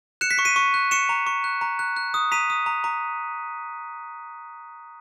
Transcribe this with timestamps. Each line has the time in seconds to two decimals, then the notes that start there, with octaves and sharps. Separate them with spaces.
0.21 F#6 C#7 E7
0.31 B6
0.37 C#6 C#7
0.45 B6 D#7
0.56 C#6
0.74 F#6
0.91 C#6 C#7 E7
1.09 A#5
1.27 C#6
1.44 F#6
1.61 A#5
1.79 F#6
1.96 F#6
2.14 D#6
2.32 A#5 B6 D#7
2.50 D#6
2.66 A#5
2.84 A#5